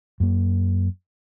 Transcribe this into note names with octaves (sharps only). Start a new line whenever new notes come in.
F#2 A#3